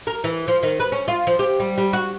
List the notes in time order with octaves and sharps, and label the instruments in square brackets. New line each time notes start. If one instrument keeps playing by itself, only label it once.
[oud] A#4
E3
F3
D#3
B4
C#4
F4
F3
G4
G3
G3
F#4